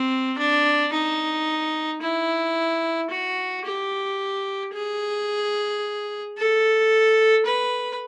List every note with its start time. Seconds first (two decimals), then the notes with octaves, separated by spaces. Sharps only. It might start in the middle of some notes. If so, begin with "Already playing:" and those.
Already playing: C4
0.38 D4
0.93 D#4
2.02 E4
3.10 F#4
3.65 G4
4.74 G#4
6.37 A4
7.46 B4